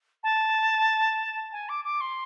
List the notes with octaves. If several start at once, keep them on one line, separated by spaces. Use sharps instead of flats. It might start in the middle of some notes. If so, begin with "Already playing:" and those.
A5
G#5
D6
D6
C6